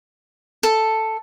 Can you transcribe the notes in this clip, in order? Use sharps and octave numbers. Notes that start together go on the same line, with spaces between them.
A4